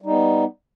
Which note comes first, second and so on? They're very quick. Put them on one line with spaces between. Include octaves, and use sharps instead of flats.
G3 D#4 B3